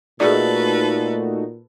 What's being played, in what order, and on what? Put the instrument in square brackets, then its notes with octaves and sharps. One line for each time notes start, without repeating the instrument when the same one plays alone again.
[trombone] A#2 [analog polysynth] A3 D#4 F#4 [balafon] G#4 D5 [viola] A4 B4